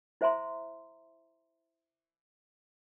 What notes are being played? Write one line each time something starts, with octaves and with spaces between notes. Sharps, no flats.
E4 C5 E5 G#5 A#5 C6